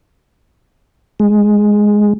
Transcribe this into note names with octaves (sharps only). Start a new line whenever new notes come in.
G#3